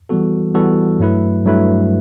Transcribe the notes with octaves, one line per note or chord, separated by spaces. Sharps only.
E3 G3 B3 F#4 A4
E3 G3 B3 F#4 A4
G2 F#3 A3 E4 B4
G2 F#3 A3 E4 B4